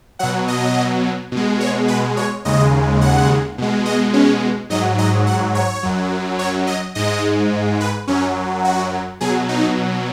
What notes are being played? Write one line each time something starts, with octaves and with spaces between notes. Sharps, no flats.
B2 F#3 F#5
D#5
B2 G#3
C#5
B4
C#5
D#2 C#3 G#3 D#5
F#5
B2 G#3
D#5
C#4
G#2 F#3 D#5
D#5
F#5
C#5
F#2 F#3
C#5
D#5
G#2 G#3 D#5
B4
F#2 F#3 C#4
F#4
B2 F#3 G#4
D#4